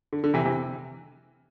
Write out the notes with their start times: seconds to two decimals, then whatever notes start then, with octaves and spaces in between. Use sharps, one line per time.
0.13 D3
0.24 D3
0.34 C3 E3
0.45 C3 E3